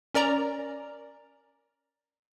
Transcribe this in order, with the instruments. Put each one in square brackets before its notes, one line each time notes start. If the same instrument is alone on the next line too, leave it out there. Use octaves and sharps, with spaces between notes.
[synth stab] C#4 A#4 D5 A#5